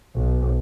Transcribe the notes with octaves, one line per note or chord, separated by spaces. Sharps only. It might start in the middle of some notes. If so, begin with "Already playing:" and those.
B1